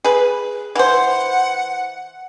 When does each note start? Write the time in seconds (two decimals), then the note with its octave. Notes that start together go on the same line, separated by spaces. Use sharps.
0.04 G#4 B4
0.75 E3 C5 F#5